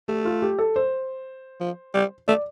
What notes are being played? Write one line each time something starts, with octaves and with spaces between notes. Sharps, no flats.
A3 G4
F4
G4
A4
C5
F3
G3
A3 D5